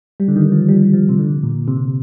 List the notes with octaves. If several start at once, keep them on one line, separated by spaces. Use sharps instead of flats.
G3
D3
D#3
F3
G3
F3
C3
D3
A#2
C3